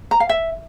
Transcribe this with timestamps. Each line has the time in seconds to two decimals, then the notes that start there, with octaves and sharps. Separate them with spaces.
0.11 A#5
0.20 F5
0.29 E5